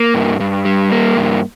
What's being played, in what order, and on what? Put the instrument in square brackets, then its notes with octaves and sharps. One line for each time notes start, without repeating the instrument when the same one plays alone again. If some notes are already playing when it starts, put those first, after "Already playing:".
Already playing: [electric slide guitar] A#3
G2
G2
G3
A#3
G2